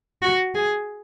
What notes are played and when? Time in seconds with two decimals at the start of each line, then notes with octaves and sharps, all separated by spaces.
0.22 F#4
0.55 G#4